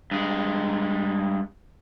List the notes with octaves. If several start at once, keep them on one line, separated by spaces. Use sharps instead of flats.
G2 G#3